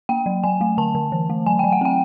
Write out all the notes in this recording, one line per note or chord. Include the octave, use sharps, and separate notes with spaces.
A#3 G5
F#3
F#3 G#5
A3
D3 A5
D3
E3
A3
F#3 G#5
F#3 G5
F#5
C4 G5